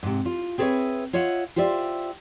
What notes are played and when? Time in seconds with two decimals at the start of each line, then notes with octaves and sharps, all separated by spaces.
0.03 G#2 C3
0.26 F4
0.58 C4 G#4 A4 B4 C#5 E5
1.13 F4 C#5 D#5 E5 F#5
1.56 F4 G4 C5 D5 E5